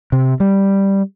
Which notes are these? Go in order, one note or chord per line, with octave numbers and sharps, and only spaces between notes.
C3
G3